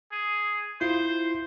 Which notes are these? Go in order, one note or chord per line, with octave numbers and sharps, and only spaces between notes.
G#4
E4 F4 C5